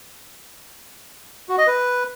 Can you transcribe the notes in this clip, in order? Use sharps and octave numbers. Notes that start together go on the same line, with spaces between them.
F#4
D#5
B4